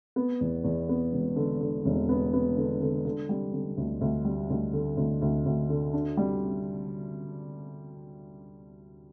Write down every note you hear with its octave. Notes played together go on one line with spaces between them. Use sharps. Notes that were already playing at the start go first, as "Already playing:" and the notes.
B3
E2
E2
B3
E1
D3
D3
E1
B3
B3
D3
D3
D3
G3
D3
D2
D2
G3
D2
D3
D2
D2
D2
D3
D4
G3